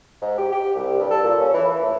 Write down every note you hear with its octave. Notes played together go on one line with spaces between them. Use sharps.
G#2
G4
G4
C2
G2
A4
A#2
C#4
E3
E3
A2